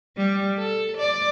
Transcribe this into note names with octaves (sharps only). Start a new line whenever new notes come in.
G3
A4
D5